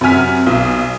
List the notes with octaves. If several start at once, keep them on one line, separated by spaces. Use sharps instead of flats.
F#2 C3 F#4 G#5 F6 B6
B1 D#6